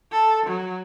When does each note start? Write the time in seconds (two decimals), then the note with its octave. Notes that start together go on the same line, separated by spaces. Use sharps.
0.11 A4
0.46 F#3